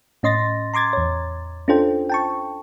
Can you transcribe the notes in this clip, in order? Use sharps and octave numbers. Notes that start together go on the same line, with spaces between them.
A2 C#4 D#5 C6 A6 A#6
A#5 C6 D6 G#6 A6
E2 C#5
C#4 D4 F4 A4 C5 G5
G5 A5 C#6